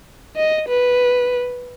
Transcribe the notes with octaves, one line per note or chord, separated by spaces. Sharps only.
D#5
B4